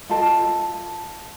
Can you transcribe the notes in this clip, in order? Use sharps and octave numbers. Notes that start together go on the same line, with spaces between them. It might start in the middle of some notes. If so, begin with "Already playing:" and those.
F4 A4 D#5 A5